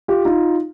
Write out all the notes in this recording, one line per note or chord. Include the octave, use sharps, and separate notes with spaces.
F4 G4
D#4 F4